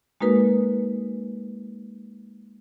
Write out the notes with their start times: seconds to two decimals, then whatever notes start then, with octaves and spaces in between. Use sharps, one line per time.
0.21 G#3 A#3 D#4 F#4 A#4 B4